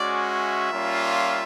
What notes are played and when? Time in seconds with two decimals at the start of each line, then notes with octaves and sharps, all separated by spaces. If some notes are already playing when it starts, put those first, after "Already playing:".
Already playing: G#3 C#4 F#4 D5
0.30 E5
0.72 G3 A#3 C#4 F4